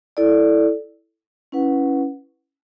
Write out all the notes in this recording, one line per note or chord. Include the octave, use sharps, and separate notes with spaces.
E4 A4 D5
C#4 E4 B4 F#5